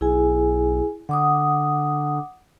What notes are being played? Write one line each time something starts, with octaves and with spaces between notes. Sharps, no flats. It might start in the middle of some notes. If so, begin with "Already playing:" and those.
B1 E4 G#4 G#5
D3 F#5 D6 D#6